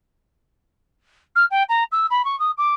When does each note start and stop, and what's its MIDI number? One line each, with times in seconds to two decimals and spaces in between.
1.36 1.45 89
1.51 1.63 79
1.69 1.84 82
1.92 2.07 88
2.10 2.25 83
2.25 2.38 85
2.39 2.51 87
2.58 2.75 86